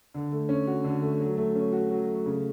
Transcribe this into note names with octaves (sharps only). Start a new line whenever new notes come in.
D3
A3
C#4
F#4
D3
A3
F#3
A3
C#4
F#4
F#3
A3
C#3